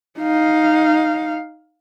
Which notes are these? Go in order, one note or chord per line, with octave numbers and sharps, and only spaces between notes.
D#4 F5